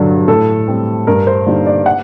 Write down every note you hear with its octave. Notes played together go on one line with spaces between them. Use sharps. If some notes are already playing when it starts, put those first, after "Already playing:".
Already playing: G2 D3 F#3
A2 A4
G3 C4
G2 A#4
C5
D3 G3 A#3 D#4
D5
F#5